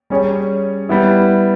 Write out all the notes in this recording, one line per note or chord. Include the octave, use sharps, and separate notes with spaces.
G3 C#4 G#4 C#5
G3 B3 E4